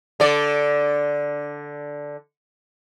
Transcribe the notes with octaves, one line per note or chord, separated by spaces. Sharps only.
D3 D5